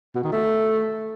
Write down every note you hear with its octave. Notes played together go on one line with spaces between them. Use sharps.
B2
D#3
A3